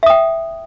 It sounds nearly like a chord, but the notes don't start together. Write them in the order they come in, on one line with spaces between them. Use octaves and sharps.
E5 D#6 G5